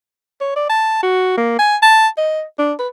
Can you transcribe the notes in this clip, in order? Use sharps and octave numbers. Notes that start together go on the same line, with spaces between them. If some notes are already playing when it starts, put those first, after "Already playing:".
C#5
D5
A5
F#4
A#3
G#5
A5
D#5
D4
B4